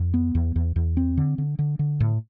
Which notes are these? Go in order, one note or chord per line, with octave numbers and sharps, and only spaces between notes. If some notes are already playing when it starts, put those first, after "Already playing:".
Already playing: F2
B3
E2
E2
E2
C4
D3
D3
D3
D3
A2